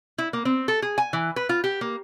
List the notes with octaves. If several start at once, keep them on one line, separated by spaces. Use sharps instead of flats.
E4
A#3
C4
A4
G#4
G#5
E3
B4
F4
G4
A#3